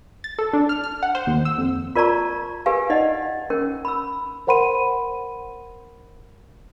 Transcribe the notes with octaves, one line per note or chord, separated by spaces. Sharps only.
A6
A4
D4
F6
F6
F#5
C5
D#2
E6
F2
F4 A#4 D5 A5 A#5 C#6
G4 A#4 B4 F5 G#5
D#4 D5 D#5 F#5
C#4 A#4 G5
B5 E6
A#4 C5 F#5 B5 C6 D#7